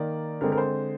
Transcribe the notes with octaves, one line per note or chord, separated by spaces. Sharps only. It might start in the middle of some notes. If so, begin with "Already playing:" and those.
Already playing: D#3 A#3 D5
D3 G#3 C4 A#4
A#4
C5